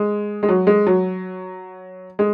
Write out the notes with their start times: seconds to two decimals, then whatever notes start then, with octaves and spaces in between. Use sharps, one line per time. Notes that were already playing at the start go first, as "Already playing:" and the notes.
Already playing: G#3
0.43 G#3
0.49 F#3
0.67 G#3
0.87 F#3
2.19 G#3